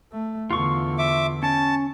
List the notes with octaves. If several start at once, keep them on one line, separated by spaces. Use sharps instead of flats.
A3
E2 D3 F4 C#6
E5 D6
C#4 A5